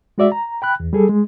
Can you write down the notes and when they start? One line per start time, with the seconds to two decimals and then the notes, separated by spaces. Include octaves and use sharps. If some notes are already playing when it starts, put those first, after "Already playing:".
0.18 G#3 F#4 D5 E5
0.32 A#5
0.62 G5 B5 F#6
0.80 E2
0.93 G3 G#4 A4
1.09 G#3